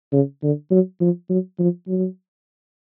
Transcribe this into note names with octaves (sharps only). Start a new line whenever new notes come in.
C#3
D3
F#3
F3
F#3
F3
F#3